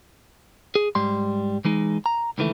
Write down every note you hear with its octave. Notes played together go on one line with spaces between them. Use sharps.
G#4
G#2 G3 C6
E3 G#3 D#4
A#5
C#2 D#3 E3 A3